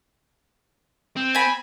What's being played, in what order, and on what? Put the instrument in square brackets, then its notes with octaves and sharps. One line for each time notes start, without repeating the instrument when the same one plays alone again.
[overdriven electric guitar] C4
[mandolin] G#5 B5